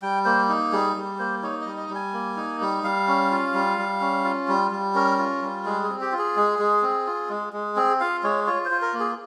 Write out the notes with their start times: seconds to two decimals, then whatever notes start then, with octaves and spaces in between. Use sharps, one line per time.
0.02 G3 G5
0.25 A#3 C5
0.49 D#4
0.72 G3 G#4
0.96 G3
1.19 A#3 C5
1.43 D#4 C#5
1.61 G3 D#5
1.77 D#5
1.90 G3
1.95 G#5
2.13 A#3
2.37 D#4
2.61 G3
2.83 G3 F5
3.08 C#4
3.31 F4
3.54 G3
3.78 G3
4.01 C#4
4.25 F4
4.48 G3
4.71 G3
4.94 C#4 A#4
5.18 F4
5.42 G3
5.65 G#3 G#4
5.84 G#4
5.89 C4
6.01 G4
6.12 F4
6.18 G#4
6.36 G#3
6.59 G#3
6.82 C4
7.07 F4
7.29 G#3
7.53 G#3
7.76 C4 G#4
8.00 F4 F5
8.23 G#3 C#5
8.47 F4 C#5
8.65 C5
8.71 F4
8.82 A#4
8.94 A#3
9.00 G#4